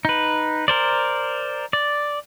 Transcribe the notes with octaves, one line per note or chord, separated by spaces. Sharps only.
D#4 B4
A#4 C5 D5
D5